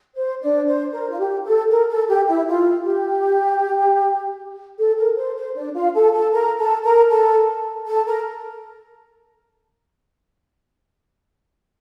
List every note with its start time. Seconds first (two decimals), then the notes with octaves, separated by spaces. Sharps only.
0.15 C5
0.42 D4 D5
0.67 C5
0.93 A#4
1.10 F4
1.19 G4
1.45 A4
1.70 A#4
1.89 A4
2.08 G4
2.28 E4
2.47 F4
2.86 G4
4.79 A4
4.97 A#4
5.17 C5
5.36 C5
5.56 D4 D5
5.75 F4 F5
5.94 A4 A5
6.14 A4 A5
6.33 A#4 A#5
6.58 A4 A5
6.84 A#4 A#5
7.09 A4 A5
7.87 A4 A5
8.06 A#4 A#5